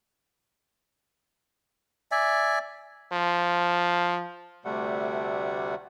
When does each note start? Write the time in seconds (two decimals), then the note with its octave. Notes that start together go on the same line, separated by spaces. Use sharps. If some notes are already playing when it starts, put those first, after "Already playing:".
2.11 D5 E5 G#5
3.12 F3
4.65 D2 C3 G3 A3 F#5